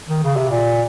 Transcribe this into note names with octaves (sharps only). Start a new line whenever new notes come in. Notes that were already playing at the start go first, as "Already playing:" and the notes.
D#3
C#3
C3
A#2